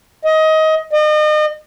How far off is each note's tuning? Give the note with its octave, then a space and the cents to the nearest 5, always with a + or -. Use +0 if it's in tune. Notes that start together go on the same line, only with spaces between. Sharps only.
D#5 +20
D#5 -35